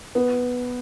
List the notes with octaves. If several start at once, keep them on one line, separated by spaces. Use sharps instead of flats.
B3